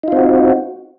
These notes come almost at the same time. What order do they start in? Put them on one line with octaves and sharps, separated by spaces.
D#4 F4 C4 F#4